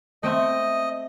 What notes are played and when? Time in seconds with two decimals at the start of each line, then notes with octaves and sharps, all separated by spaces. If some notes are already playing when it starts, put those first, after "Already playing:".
0.23 A3 C4 D#5 E5